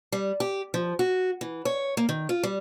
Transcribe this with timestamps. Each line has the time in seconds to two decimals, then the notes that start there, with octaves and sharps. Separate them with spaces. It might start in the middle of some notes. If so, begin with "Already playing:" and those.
0.12 G3
0.40 G4
0.74 F3
0.99 F#4
1.41 E3
1.65 C#5
1.97 A#3
2.09 D#3
2.29 F4
2.43 G3